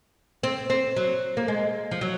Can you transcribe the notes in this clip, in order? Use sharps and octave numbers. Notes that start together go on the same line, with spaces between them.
C4
C4
F#3
A#3
G#3
F3
F#3